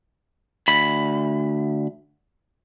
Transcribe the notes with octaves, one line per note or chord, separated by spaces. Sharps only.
D2 B5